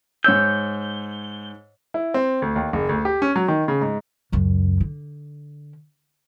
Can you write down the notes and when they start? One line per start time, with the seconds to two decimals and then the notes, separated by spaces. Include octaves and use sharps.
0.24 G#2 C#5 E6 G6
1.94 E4
2.14 C4
2.42 D2
2.56 D#2
2.73 F#1
2.89 D2
3.05 G4
3.22 C#4
3.36 F#3
3.48 D#3
3.68 C#3
3.81 G#2
4.32 C#2 F#2
4.80 D3